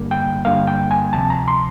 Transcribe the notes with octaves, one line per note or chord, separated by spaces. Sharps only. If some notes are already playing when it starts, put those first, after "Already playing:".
Already playing: G2 D3 G3 A#3
G5
G2 D3 G3 A#3 F5
G5
G#5
D2 C3 F3 A5
A#5
C6